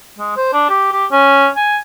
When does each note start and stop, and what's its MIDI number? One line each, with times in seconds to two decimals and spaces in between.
0.18 0.33 56
0.37 0.52 72
0.53 0.68 62
0.69 0.89 67
0.92 1.05 67
1.11 1.48 61
1.56 1.77 80